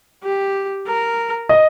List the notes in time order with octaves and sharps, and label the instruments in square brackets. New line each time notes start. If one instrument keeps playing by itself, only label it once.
[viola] G4
A#4
[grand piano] D#5